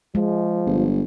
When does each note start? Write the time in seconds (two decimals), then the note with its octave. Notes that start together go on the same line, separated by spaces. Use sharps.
0.15 F3 G#3
0.66 G1